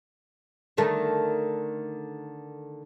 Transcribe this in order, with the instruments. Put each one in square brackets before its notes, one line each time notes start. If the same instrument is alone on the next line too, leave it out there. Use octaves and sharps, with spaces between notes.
[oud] D3 D#3 A3